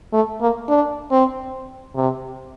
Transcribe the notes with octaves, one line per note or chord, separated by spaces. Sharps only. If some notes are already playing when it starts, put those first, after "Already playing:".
A3
A#3
D4
C4
C3